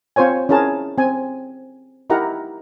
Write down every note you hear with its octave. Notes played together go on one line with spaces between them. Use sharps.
C4 F4 C5 C#5 G#5
C#4 E4 G#4 A#4 A5
C4 G#5
D#4 E4 G4 A#4 F#5 A#5